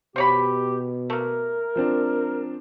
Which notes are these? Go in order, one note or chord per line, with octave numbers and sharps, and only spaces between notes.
B2 G4 C5 C#5 B5
A3 A#3 A#4
F3 C4 D4